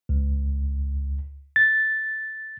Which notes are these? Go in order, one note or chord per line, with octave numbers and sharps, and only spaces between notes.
C#2
A6